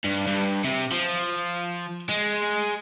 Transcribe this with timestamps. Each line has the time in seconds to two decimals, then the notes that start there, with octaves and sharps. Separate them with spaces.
0.05 G2
0.27 G2
0.65 C3
0.92 F3
2.09 G#3